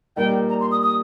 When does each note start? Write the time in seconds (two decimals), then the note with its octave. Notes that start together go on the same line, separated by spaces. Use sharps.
0.16 A#2 G3 D#4 A#4 D#5 G5
0.49 A#5
0.61 C6
0.71 D#6
0.82 D#6